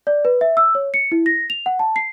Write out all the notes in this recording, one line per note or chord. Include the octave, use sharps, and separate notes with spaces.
D5
B4
E5
E6
C#5
C#7
E4
A#6
F7
F#5
A5
C7